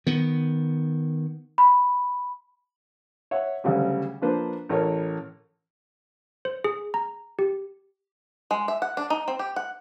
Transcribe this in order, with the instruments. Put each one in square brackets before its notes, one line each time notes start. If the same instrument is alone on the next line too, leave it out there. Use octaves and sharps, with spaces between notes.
[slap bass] D#3 B3
[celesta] B5
[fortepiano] C#5 E5 F#5
D2 C#3 F#3 G3
F3 A#3 D4 B4 C5
A1 A#4 C#5
[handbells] C5
G#4
A#5
G4
[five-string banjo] G#3
E5
F#5
D4
D#4
C4
G4
F#5